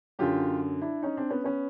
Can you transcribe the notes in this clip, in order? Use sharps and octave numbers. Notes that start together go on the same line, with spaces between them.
F#2 D3 F#3 F4 G4
D4 E4
C#4 D#4
C4 D4
B3 C#4
B3 C#4